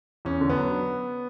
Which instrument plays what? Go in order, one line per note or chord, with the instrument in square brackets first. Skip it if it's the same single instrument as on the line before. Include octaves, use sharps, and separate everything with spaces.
[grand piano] E2 C#4
D3
B3
F#3